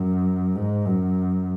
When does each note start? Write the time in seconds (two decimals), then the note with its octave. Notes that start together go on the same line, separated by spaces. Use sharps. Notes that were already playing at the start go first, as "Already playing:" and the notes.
Already playing: F#2
0.55 G#2
0.86 F#2